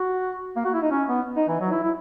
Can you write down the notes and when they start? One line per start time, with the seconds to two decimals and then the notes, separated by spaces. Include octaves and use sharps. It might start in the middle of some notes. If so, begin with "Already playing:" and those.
Already playing: F#4
0.56 A#3
0.65 F#4
0.74 E4
0.82 D#4
0.91 C#4
1.08 B3
1.37 D#4
1.48 E3
1.61 F#3
1.72 E4
1.83 E4